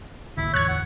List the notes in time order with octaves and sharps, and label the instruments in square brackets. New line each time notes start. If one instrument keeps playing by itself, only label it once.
[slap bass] G#1 D#2 D3 [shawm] E4
[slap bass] E2 A2 D3 [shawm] C#5 [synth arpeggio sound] F#6 G#6
[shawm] F#5